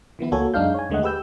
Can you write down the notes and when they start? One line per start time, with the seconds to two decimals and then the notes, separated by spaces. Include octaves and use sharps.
0.19 D#3 E3 B3 E4
0.32 C#2 A#3 F#4 A4 C#5 G#5
0.54 F#2 G#3 D4 D#4 F5 G6
0.74 C#5 G#5
0.90 D#2 D3 G#3 A3 D#5 F#5
1.03 G4 B4 E6 G6